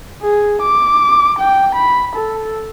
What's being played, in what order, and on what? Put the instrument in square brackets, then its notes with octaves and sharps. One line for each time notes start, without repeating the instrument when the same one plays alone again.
[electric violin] G#4
D6
G5
B5
A4